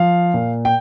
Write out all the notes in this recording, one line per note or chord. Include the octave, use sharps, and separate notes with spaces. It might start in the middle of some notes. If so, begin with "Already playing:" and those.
Already playing: F3 F5
A#2
G5